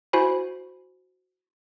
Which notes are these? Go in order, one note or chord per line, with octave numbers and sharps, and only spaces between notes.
E4 F#4 C5 G#5 B5